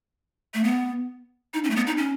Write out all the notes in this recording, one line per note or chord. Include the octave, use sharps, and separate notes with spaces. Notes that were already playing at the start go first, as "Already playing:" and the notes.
A3
B3
D#4
C#4
A3
B3
D#4
C#4